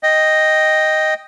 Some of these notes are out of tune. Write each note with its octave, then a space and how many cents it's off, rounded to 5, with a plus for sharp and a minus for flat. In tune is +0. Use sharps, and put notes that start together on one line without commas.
D#5 +0 G5 +0